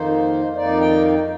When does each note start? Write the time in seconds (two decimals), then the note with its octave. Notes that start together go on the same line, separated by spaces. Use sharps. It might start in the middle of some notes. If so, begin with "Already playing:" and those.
Already playing: F2 D#3 A#3 D#4 C5
0.56 F2 D#3 A#3 D#4 D5
0.81 G5